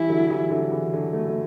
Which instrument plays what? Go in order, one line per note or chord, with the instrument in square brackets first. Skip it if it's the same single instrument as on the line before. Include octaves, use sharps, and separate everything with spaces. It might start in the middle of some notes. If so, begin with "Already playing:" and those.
Already playing: [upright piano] E3 G3 [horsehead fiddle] E4
[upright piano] D3 F#3
E3 G3
D3 F#3
C#3 E3
D3 F#3
F#3 A3
A3